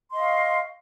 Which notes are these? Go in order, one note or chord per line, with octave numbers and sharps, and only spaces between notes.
D#5 F5 C6 C#6